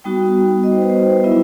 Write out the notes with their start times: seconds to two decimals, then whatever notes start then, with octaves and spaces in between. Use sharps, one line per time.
0.04 G3 B3 D#4 F#4 G5
0.64 D#5
0.72 C5
0.82 B4
0.90 C5
1.24 F#3 B3 E4 E5